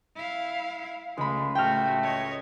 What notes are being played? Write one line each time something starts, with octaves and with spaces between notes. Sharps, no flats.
E4 F5
C#2 G#3 A3 B5
A2 A3 F#4 G5 F6
C#5 D#5